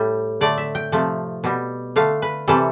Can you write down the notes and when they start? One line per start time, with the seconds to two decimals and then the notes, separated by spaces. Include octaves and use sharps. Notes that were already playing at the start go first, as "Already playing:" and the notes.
Already playing: A2 G3
0.41 D3 A3 D5
0.58 E5
0.75 G5
0.92 C3 F3 A3
1.44 B2 G3
1.96 D3 A3 F5
2.22 B4
2.48 C3 E3 G3 A4